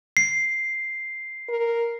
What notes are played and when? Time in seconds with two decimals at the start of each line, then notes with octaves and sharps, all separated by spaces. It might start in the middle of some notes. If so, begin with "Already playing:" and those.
0.17 C7
1.49 A#4